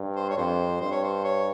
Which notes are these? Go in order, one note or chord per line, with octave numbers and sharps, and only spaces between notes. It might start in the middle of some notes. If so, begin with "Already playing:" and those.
Already playing: G2
C5
C#5
F2 C5
G2 C5
C#5
C5
C#5